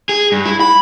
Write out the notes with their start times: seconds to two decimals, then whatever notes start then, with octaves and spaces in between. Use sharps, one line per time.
0.09 G#4
0.32 G2
0.45 E4
0.60 B5